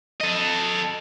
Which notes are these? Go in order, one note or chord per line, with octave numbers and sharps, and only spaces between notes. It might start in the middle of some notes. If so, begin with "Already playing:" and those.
A4 D#5